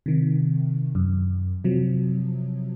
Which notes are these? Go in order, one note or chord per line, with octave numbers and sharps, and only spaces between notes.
C3 D#3
F#2
C3 F3 F#3